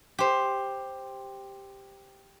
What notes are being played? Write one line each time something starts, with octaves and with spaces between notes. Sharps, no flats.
G4 C5